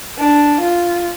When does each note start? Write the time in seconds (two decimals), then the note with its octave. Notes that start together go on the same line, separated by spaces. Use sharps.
0.18 D4
0.61 F4